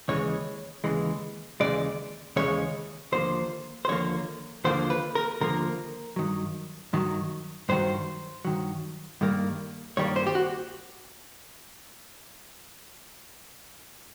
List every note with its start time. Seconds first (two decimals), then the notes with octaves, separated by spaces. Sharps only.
0.08 D#2 C#3 E3 G#3 C#5
0.84 D#2 C#3 E3 G#3
1.60 D#2 C#3 E3 G#3 D5
2.36 D#2 C#3 E3 G#3 C#5
3.12 D#2 D3 F3 A#3 C5
3.85 C5
3.89 D#2 D3 F3 A#3 C#5
4.65 D#2 D3 F3 A#3 C5
4.90 B4
5.15 A#4
5.41 D#2 D3 F3 A#3 A#4
6.16 G2 D#3 F#3
6.93 G2 D#3 F#3
7.69 G2 D#3 F#3 C5
8.45 G2 D#3 F#3
9.21 G2 D#3 G3 A#3
9.97 G2 D#3 G3 A#3 C#5
10.16 C5
10.26 G4
10.35 F#4